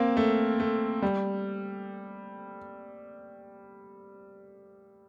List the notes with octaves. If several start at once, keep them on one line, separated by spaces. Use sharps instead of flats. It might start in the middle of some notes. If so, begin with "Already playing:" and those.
Already playing: A#3 C4
A3
A3
G3